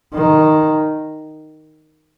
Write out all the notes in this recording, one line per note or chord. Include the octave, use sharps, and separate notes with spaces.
D#3